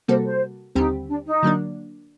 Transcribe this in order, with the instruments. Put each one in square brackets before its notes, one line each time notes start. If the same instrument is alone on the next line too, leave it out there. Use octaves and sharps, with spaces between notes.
[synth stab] C3 G3 A#3 F#4 A4 [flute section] C5
[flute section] C5
[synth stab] D#2 D3 G3 C4 G4 [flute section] D#4
[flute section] D4
D#4
[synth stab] D3 F#3 A#3 D4